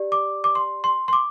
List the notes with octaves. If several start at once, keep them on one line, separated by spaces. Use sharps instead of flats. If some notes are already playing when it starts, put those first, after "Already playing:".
Already playing: G4 D5
D6
D6
C6
C6
C6
D6